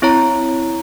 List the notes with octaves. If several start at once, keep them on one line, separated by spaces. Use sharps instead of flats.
C4 E4 C#5 A#5